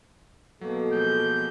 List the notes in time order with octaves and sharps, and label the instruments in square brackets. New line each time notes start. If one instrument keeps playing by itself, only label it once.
[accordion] B2 A#3 [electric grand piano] F#3 [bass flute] A4
[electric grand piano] F3 G#3 [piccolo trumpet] G6